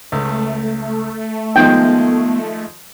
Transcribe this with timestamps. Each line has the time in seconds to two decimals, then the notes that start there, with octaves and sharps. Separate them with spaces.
0.12 C#2 A3
1.56 D#3 F3 G#3 B3 G5